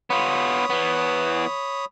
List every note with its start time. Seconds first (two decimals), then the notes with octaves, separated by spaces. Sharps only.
0.10 B3 F4 C#5 B5 D#6
0.70 E3 B3